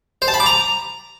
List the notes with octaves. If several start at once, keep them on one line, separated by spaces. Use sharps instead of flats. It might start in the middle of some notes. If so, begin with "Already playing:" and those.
C5
A5
B5
D6
A#5